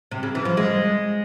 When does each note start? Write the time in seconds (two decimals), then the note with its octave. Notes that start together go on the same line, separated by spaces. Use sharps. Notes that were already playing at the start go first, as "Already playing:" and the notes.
0.11 C3
0.23 C#3
0.35 E3
0.45 F3
0.57 G#3